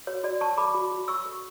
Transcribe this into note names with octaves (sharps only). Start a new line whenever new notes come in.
F#4 C#5
F#4 D5
C#5 A5 C#6
A4 B5 D6
F#4
F#4
C#5 C#6 E6
A4